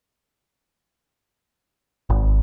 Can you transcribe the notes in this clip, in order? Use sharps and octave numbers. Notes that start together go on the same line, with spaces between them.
G#1